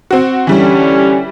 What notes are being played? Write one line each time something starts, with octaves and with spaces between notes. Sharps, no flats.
C4 F#4
D3 E3 G3 C#4 G4